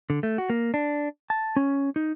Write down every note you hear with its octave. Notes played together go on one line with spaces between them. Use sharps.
D3
A3
F#4
A#3
D4
A5
C#4
D#4